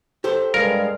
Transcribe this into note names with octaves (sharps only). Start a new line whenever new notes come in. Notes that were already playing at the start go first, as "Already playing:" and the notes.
G4 A4 C5
G2 G#3 G#4 A#4 F5